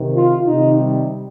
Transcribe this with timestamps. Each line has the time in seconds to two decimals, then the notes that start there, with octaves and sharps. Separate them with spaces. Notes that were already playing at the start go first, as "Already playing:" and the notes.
Already playing: C3 D#3
0.14 F4
0.47 C3 D#3 D#4
0.81 G3